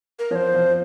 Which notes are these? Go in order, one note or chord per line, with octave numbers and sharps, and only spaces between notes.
A#4
F3 C5 C#5
F3